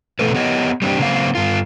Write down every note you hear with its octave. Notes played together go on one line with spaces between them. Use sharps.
B2 E3 A3 A4 B4
B3 G4 C#5 D#5
G3 C4 D4 G4
C#3 F#3 A#3 C4 F5
G2 F4